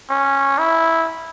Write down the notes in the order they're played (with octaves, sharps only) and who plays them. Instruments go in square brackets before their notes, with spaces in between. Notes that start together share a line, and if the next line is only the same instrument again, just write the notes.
[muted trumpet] C#4
E4